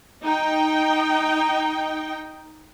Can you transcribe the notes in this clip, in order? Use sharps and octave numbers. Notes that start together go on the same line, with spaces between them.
D#4 G5